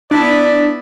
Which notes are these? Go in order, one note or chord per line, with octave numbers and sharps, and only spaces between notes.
B3 D4 E4 D5